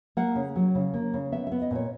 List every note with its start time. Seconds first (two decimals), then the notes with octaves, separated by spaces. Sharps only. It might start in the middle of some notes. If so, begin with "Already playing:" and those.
0.17 A#3 F#5
0.35 C#3
0.56 F#3
0.75 C#3
0.94 A#3
1.14 C#3
1.32 B3 E5
1.47 B3 E5
1.62 D#5
1.71 A#2 C#5